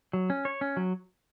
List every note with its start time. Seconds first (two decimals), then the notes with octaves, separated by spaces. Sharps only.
0.13 F#3
0.30 C#4
0.45 C#5
0.61 C#4
0.77 F#3